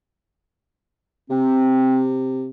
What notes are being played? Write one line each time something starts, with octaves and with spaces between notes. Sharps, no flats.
C3 C4